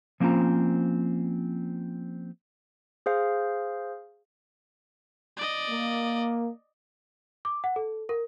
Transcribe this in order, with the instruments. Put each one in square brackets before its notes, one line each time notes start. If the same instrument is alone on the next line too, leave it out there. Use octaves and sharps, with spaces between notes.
[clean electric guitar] F3 A#3 C4 C#4 F4 A#5
[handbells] G#4 C5 F5
[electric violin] D5 D#5
[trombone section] A#3
[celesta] D6
F#5
A4
A#4